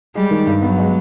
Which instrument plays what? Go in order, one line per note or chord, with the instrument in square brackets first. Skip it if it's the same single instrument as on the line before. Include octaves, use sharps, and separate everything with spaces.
[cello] G3 [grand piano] G#3
[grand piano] D#3
G2
[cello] F#3 [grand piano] B3
[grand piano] G#3